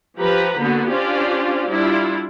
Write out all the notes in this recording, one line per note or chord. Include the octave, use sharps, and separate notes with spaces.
F3 G4 B4 A#5 B5
D3 A#3 B3 F#4
C#4 D4 F4 G4 C5 D5
G3 D4 E4 F4